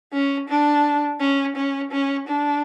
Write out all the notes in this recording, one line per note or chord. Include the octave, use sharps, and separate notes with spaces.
C#4
D4
C#4
C#4
C#4
D4